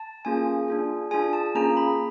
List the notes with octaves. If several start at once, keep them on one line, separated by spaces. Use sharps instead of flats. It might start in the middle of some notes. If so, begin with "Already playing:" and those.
Already playing: A5
A#3 C#4 F4 G#4 G#5
D4 F4 G#4
D4 F4 G#4 G#5
A5
A#3 C#4 F4 G#4 A#5
B5